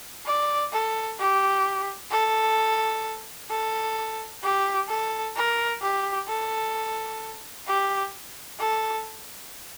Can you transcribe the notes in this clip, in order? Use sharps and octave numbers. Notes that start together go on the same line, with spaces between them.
D5
A4
G4
A4
A4
G4
A4
A#4
G4
A4
G4
A4